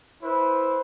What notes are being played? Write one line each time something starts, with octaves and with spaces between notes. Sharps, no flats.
E4 B4 C5